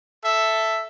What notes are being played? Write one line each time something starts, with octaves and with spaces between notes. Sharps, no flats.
A4 E5